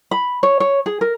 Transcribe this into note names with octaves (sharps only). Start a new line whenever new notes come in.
B5
C#5
C#5
G#4
A#4